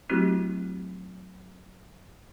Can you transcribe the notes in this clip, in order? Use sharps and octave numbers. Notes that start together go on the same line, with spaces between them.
F#3 A3 C4 E4 F#4 G4